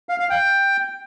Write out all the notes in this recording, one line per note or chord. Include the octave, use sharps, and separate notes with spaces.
F5
F5
G5